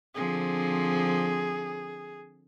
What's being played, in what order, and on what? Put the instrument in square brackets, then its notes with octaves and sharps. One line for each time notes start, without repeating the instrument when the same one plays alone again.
[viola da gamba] D3 F3 C4 [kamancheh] G#4